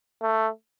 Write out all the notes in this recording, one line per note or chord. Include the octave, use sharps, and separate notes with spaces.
A3